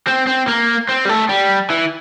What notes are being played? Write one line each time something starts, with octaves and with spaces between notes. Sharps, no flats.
C4
C4
A#3
C4
G3
A3
G3
E3